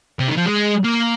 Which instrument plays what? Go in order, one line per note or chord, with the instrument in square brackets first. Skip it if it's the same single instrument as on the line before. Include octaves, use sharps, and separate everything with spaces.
[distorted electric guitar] C3
D#3
F3
G#3
A#3